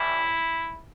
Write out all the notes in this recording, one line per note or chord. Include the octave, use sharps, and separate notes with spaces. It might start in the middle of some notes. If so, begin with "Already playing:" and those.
Already playing: A2 E3 G3 E4